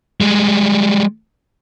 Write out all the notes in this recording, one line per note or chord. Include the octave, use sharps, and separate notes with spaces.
G3 G#3